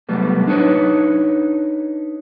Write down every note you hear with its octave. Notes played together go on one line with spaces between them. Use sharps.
C2 F#3 G3 A3 B3
D4 D#4 B4 C#5